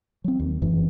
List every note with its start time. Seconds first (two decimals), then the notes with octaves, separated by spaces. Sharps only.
0.24 F#3 C4
0.39 D#2
0.62 F1 F#2 E3